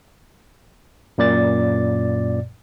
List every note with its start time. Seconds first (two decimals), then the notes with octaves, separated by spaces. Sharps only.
1.18 F#2 A#2 D5 A6